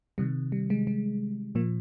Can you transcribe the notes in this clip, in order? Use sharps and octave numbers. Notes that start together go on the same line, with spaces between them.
C3 D#3 G3
G3
G#3
G#3
A#2 F3 A#3